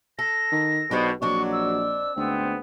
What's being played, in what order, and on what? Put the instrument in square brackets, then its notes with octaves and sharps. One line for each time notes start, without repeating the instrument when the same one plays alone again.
[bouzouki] A4 [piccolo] A#6
[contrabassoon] D#3
[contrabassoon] B1 [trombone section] B2 [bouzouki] D4 G4 C5
[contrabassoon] A#1 [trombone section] F#3 [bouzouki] C4 D4 D#5 [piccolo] C#6
[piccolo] E6
[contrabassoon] D2 [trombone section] G#2 B3 C4